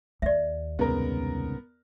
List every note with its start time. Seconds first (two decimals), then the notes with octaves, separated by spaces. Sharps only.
0.22 D#2 D5 E5
0.79 C2 G#2 C#3 B3 A#4